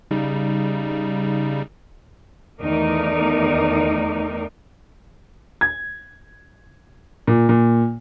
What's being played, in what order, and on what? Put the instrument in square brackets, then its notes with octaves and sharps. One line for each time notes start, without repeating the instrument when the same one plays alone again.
[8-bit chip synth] C#3 G3 D#4
[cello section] E2 D#3 A3 D#4 A#4 D5
[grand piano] G#6
A#2
A#2